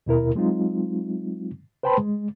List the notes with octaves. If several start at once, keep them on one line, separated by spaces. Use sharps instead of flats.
D#2 B2 E4 A#4
F#3 G#3 C4 D#4 F4
B4 C5 G5 A5 B5 C6
G#3